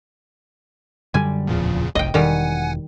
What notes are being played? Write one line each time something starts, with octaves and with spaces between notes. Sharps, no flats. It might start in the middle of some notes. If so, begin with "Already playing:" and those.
F#2 D3 G3 G#5
D1 E2 A#2 C#3 F3
F1 B1 D#5 G5
E1 D#3 G3 F#5 G#5